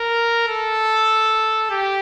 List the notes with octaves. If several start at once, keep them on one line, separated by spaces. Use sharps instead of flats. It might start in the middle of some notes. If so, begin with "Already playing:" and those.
Already playing: A#4
A4
G4